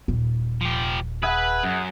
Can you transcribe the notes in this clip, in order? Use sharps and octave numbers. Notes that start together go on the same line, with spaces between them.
D#1
F3 G4
G#4 B4 E5 F#5
F#2